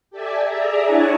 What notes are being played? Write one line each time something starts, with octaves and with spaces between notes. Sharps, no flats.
G4 A4 D5 E5 G#5
G#4 D5 E5 A#5
D4 E4 C#5 F#5 G#5 A5